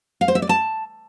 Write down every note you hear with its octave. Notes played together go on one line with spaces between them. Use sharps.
F5
C5
E5
D5
A5